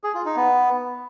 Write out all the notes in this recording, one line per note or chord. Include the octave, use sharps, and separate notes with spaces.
G#4
F4
D#4
B3